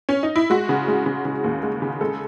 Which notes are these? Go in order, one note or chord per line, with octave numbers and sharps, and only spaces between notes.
C#4
D#4
E4
G#3 F#4
C#3
G#3
C#3
C#3
D#2
G#3
C#3
G#3 A4